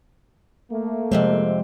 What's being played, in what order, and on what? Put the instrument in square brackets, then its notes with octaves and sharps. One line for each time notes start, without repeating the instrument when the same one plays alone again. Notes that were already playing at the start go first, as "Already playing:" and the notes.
[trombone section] A3 A#3
[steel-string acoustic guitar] F2 C3 C4 [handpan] F3 G#3